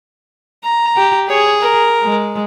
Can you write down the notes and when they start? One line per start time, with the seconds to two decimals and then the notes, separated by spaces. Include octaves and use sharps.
0.63 A#5
0.96 G4
1.29 G#4 C#5
1.60 A#4
2.03 G#3